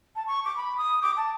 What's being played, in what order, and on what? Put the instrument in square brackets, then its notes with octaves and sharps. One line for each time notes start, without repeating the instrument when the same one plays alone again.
[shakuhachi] A5
C#6
D6
B5
D#6
D6
A5